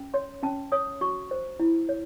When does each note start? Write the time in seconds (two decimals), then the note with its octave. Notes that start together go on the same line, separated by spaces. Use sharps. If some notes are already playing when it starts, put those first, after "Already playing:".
Already playing: C#4
0.14 C#5 C6
0.43 C#4 A5
0.72 C#5 D#6
1.01 F#4 C#6
1.31 C5
1.60 E4
1.89 C#5